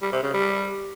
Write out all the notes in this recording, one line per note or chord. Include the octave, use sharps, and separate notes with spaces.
G3
C3
C#3
G3